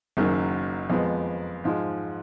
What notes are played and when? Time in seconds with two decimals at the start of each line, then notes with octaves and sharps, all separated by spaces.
0.17 F#1 F#2 D#3 F#3 A#3
0.90 F2 F3 G#3 B3
1.64 G#2 F3 G#3